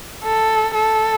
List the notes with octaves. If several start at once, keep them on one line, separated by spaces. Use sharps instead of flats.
A4
A4